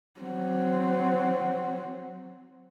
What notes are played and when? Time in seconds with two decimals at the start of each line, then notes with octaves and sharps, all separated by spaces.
0.21 F#3 C4